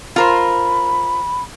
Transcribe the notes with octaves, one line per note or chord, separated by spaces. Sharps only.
F4 A#4 C5 B5